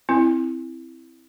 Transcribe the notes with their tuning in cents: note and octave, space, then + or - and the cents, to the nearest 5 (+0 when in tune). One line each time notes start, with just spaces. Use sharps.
C4 +0 E4 +0